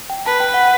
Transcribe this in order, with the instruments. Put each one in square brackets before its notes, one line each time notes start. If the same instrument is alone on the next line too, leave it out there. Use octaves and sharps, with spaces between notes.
[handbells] G5
[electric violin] B4 [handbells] A5
[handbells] G5
F#5